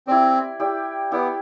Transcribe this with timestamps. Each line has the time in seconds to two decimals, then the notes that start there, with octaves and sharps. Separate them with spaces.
0.07 C4 E4 G4 D5
0.60 E4 G4 D5
1.12 B3 E4 G4 D5